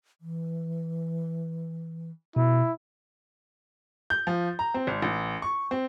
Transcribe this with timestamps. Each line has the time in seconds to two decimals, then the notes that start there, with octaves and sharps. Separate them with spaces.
0.21 E3
2.36 B2 E4
4.10 G6
4.27 F3
4.59 A#5
4.74 C4
4.87 G#1
5.02 A1
5.42 C#6
5.71 C4